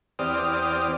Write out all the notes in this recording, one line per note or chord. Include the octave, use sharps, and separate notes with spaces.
E2 C4 G4 D5 D#6 F6